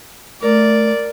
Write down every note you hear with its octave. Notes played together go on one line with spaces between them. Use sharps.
A3 A#4 D5